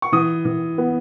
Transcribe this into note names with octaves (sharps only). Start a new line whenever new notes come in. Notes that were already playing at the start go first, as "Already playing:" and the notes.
C#6
E3 D#6
E3
B3